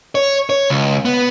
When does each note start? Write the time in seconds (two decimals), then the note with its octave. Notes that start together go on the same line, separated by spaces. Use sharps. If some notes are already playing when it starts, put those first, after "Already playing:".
0.15 C#5
0.50 C#5
0.70 C#2
1.05 B3